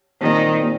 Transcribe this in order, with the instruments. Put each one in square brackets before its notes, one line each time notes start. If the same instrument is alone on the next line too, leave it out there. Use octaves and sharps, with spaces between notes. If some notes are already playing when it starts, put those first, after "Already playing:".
[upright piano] A#2 G3 C4 [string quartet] D#3
[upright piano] A#2 G3 C4